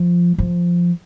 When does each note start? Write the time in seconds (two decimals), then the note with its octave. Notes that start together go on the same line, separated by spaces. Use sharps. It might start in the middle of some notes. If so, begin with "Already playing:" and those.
Already playing: F3
0.38 F3